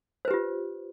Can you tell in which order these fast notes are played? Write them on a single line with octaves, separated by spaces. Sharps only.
C5 B4 G4 F4